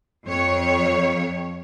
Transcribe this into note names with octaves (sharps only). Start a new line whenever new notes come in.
F2 C#5